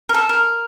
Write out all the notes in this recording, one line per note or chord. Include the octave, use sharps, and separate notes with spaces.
A#4
A4
A#4